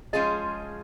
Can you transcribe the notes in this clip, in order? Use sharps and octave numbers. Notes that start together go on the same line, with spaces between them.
F3 G#3 C#4 F4 G#4 D#5